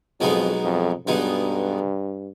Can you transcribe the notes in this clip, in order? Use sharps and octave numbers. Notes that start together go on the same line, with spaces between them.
B1 F2 B2 G#3 B3 D#4
F2
B1 G2 B2 G#3 B3 D#4